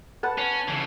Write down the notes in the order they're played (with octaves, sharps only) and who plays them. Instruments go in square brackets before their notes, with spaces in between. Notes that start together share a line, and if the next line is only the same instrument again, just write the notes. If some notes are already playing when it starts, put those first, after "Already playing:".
[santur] B4 F#5 A5
[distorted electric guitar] C#4
C#3 E3